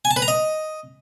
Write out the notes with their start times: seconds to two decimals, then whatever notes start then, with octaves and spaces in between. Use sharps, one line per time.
0.05 G#5
0.11 A5
0.16 B4
0.22 A#5
0.28 D#5